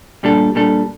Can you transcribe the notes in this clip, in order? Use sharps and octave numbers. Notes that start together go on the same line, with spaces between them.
A#2 G3 D4 A4
A#2 G3 D4 A4